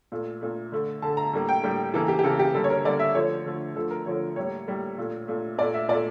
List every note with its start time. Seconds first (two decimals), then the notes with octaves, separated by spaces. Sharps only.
0.12 A#2 A3
0.41 A#2 A3
0.72 D3 A3
1.02 D3 A3 A5
1.17 A#5
1.33 A2 G3 A#3
1.49 G5
1.63 A2 G3 A#3
1.94 C#3 E3 A#3 A4
2.08 G4
2.19 G4
2.23 C#3 E3 A#3 A4
2.39 G4
2.54 D3 G3 A#3 A4
2.64 C#5
2.70 A#4
2.84 D3 G3 A#3 D5
2.99 E5
3.15 D3 F3 A3 C#5
3.46 D3 F3 A3
3.76 D3 F3 A3 A4
3.91 A#4
4.06 D3 F3 A3 C#5
4.36 A2 G3 A#3 C#5
4.68 A2 G3 A#3
4.98 A#2 A3
5.28 A#2 A3
5.58 A#2 A3 D5
5.74 E5
5.88 A#2 A3 D5